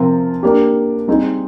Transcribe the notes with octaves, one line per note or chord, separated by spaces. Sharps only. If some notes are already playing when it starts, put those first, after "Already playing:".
Already playing: C3 F3 C4 F4 A#4
A#3 D4 G4
G3 C4 D#4 G#4